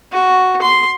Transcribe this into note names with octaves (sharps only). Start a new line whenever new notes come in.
F#4
C6